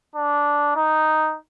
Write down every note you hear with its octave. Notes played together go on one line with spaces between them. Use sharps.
D4
D#4